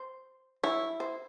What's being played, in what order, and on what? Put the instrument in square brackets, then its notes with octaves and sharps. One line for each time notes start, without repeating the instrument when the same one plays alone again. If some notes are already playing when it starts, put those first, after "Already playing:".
Already playing: [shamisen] C5
[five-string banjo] E4 [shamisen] C#5
[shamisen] C5